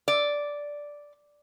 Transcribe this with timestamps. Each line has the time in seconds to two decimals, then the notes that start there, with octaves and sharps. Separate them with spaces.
0.08 D5